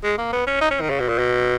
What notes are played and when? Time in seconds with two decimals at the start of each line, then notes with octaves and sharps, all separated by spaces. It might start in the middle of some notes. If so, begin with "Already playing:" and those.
0.04 G#3
0.18 A#3
0.33 B3
0.47 C#4
0.61 D#4
0.71 C#4
0.81 D#3
0.90 C#3
1.00 B2
1.09 A#2
1.18 B2